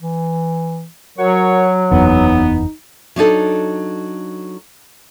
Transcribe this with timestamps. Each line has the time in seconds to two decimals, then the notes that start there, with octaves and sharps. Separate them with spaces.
0.01 E3
1.18 F#3 F#4 A#4 C#5 C#6
1.91 F#1 E2 B3 D#4
3.16 F#3 D4 D#4 A4